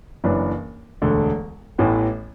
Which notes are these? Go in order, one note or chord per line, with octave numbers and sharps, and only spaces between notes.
F#1 F#2 E3 D4 B4
E1 D2 D3
A1 A2 E3 B3